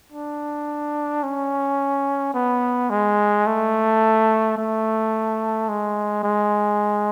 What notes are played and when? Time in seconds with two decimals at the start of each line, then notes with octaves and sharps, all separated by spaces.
0.12 D4
1.23 C#4
2.34 B3
2.90 G#3
3.46 A3
4.57 A3
5.69 G#3
6.24 G#3